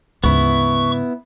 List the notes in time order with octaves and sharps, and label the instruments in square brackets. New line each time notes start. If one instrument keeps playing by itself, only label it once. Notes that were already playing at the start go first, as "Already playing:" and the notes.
[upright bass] D2 [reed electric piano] G#2 C#3 [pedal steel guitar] B3 E4 [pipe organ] C#6